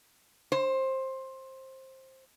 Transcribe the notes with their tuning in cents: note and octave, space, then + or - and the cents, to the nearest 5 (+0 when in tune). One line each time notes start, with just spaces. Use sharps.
C5 +15